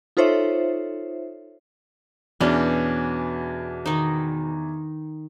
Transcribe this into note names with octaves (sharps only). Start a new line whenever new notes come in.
D#4 F4 A4 C5 C#5 E5
E2 B2 C#4 D4
D#3 D#4